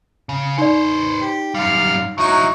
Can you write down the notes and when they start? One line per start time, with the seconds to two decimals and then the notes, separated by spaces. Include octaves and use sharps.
0.29 C#3
0.58 D#4 B4 C5 D5
1.21 G4
1.55 F#2 G3 F5
2.18 F#3 D#4 E4 D#5 C#6